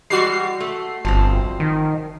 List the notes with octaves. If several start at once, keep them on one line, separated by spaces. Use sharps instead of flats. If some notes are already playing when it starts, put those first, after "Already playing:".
E3 G3 G#3 F#4 C7
A3
G1 F3 C4
D#3